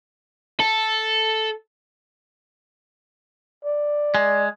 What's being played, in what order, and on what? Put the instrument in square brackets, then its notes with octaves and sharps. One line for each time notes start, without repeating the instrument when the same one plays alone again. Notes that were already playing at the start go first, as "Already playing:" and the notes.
[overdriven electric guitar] A4
[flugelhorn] D5
[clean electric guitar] G#3